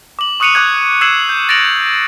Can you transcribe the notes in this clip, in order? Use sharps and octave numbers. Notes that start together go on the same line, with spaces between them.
D6 F#7
C#6 D#6 F#6 C#7 D#7 F7
D6 F#6 G#6
E6 G#6 C7 E7 F#7
G6
A6 A#6 D7 F7 F#7